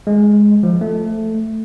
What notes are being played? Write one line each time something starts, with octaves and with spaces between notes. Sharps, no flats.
G#3
F3
A3